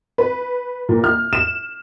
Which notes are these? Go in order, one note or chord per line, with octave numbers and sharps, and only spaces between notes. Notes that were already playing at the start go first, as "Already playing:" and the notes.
B4
A#2
F6
E7